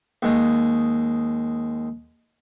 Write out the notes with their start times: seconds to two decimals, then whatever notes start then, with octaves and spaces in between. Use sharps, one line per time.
0.22 D#2 G#3